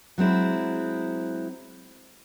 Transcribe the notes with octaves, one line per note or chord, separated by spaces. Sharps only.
F#3 G#3 C4 E4